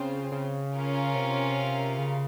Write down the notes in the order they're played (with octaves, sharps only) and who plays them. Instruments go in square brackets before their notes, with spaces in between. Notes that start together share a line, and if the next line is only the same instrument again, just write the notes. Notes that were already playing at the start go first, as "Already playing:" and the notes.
Already playing: [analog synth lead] C#3 [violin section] C4 F4 C5
[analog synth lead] C#3
[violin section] C#4 F4 A#4 F5
[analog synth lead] C3
C#3